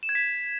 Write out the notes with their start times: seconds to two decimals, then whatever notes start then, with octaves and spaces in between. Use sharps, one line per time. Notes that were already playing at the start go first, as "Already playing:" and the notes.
0.03 E7
0.09 G#6
0.15 B6